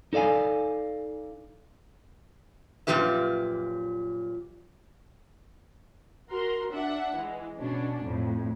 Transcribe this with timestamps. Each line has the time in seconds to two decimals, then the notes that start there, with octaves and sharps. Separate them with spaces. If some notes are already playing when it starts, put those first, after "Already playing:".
0.13 D#4 A4 D5 F5 G#5
2.87 F#2 A#2 F3 G4 B4 E5
6.30 F#4 A#4 C6
6.72 D4 E5 F#5
7.16 E3 G#3
7.59 B2 C#4 D4
8.04 F2 A2